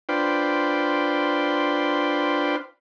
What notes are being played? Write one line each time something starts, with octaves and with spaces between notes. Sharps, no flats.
D4 F4 B4 C5 G5